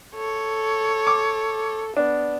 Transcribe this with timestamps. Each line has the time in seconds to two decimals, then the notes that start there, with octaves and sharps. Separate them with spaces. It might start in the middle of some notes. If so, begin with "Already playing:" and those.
0.15 A4 C#5
1.07 D6
1.97 B3 D4